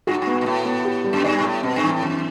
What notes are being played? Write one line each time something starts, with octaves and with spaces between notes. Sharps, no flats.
G2 F#4
A2
G2 B3
B2
A2 B3
B3
G4
G3
F#2
G2 D5
B2
A2 G3
B2 C4
G2
E3
A2
F#2 E3